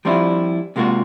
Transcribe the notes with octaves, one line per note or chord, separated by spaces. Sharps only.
F3 G3 C4 D4 E4 F4
C3 G#3 A#3 F4 F#4